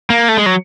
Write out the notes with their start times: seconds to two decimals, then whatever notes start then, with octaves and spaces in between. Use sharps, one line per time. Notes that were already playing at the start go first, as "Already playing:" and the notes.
0.10 A#3
0.29 A3
0.37 G#3
0.46 F#3